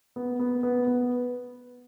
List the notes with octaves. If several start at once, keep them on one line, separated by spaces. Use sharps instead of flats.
B3
B3
B3
B3